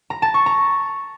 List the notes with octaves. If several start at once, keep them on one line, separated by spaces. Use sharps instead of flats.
A#5
A5
C#6
A#5